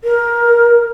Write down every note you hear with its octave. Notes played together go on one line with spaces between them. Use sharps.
A#4